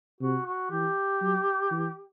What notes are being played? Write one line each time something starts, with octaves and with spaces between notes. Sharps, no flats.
C3 F#4
F#4
E3 G4
F#3
E3